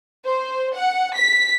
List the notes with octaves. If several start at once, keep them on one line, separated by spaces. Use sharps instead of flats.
C5
F#5
B6